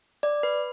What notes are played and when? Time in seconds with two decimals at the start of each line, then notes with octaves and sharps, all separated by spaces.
0.23 D5
0.43 B4